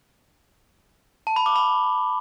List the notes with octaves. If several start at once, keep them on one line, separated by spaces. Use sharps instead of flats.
A5
B5
D6
B5